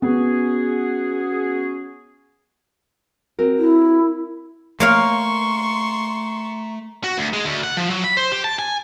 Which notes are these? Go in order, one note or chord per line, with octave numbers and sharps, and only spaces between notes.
B3 C#4 F#4 G#4
C4 F#4 A#4
E4
A3 A#3 C#5 F5 A#5 C6 C#6
F#4
D2
G#3
D2
F#5
F3
F#3
B5
C5
G4
A5
G#5